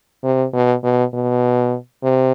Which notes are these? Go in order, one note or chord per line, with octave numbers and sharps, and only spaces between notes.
C3
B2
B2
B2
C3